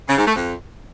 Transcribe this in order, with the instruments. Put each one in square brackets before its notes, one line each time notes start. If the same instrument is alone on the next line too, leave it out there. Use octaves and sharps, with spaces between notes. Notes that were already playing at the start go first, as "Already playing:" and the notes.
[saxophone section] C#3
G#2
A3
F2